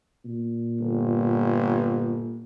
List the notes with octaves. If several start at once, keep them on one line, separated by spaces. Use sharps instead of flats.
A#2
G1